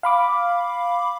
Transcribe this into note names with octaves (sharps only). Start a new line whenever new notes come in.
F5 B5 D6